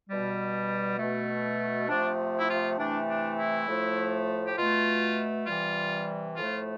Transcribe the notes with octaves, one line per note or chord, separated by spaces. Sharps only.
B2 G3
B2 A3
C3 F3 A3 D4
E4
F4
C3 E3 A3 D4
D4
E4
A2 F3 A3
G4
B2 A3 F4
C3 E3 G3 F4
A2 F3 A3 F4